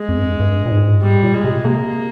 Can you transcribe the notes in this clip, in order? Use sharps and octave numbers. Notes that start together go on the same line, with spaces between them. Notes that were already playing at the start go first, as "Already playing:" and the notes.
Already playing: G#3
F2
G2
F2
G2
A#2
G#2
G2
G#2 G3
A#2
G#3
C3
C3 A#3